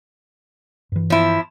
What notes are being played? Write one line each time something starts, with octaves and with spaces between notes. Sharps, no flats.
G2 E3
F3 E4